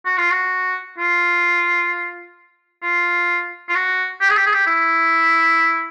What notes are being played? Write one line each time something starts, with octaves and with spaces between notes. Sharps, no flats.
F#4
F4
F#4
F4
F4
F4
F#4
G4
G#4
G4
G#4
G4
E4